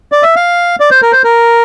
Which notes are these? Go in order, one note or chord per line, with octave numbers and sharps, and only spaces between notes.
D5
E5
F5
D5
C5
A#4
C5
A#4